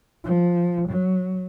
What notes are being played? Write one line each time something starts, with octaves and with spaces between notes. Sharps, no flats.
F3
F#3